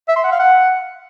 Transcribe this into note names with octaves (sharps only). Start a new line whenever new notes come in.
E5
C6
F#5
F5
F#5